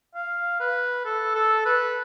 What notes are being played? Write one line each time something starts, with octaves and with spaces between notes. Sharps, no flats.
F5
B4
A4
A4
B4